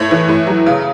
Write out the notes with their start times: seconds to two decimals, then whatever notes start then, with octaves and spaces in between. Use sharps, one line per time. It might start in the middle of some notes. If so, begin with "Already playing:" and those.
Already playing: A2 C#5
0.11 E3
0.28 A2
0.47 F#3
0.66 C#3